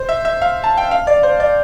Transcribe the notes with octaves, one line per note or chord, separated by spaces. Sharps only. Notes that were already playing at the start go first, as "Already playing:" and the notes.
Already playing: C5
E5
E5
F5
A5
G5
F5
D5
C5
D5